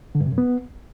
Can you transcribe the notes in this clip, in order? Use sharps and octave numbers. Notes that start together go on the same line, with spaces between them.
D3
G2
C3
F#2
B3